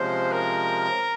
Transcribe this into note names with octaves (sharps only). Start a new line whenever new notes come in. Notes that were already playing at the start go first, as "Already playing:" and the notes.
Already playing: C3 F3 G#3 C#4 C5
A#4